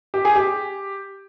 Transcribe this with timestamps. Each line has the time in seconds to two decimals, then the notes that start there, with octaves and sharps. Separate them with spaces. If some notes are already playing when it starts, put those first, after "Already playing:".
0.14 G4
0.25 G#4
0.36 G4